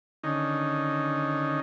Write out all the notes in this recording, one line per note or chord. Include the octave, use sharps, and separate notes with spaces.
D3 D#3 C#4 D#4